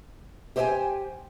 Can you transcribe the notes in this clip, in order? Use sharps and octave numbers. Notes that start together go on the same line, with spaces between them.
G4 C5 D#5 E5 G5 G#5